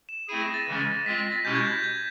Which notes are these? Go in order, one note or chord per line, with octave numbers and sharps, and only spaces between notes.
E7
A3 C4 E4 G#4 D#7
A#6
A6
C#3 E3 G#3 C#4 A6
G#3 C4 F4 B6
A#6
A6
B2 G#3 C#4 E4 G4 G6
G#6
G6
G#6